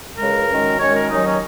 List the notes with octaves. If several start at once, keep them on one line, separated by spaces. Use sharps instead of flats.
C#2 C#3 G#3 A#4
F#2 D#3 G#3 C#4
F#2 D#3 G#3 C#4 C#5
A#4
D#2 D#3 F#3 C#4 D#4
C#4